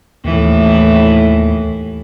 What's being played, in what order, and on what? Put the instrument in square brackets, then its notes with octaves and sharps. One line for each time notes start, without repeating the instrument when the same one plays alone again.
[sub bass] D#2 [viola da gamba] A2 E3